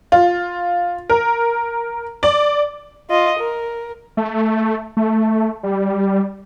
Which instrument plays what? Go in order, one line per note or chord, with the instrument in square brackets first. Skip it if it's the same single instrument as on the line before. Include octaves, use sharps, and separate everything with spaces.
[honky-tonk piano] F4
A#4
D5
[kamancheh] F4 D#5
A#4
[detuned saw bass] A3
A3
G3